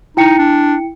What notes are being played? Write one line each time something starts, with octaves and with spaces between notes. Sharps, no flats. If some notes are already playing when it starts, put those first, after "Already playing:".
D#4 E4 G5 C#7
D4